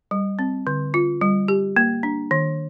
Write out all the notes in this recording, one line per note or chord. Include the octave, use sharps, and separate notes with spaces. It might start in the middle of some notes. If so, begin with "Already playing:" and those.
G3
C4
D3
F4
G3
G4
A#3
D4
D#3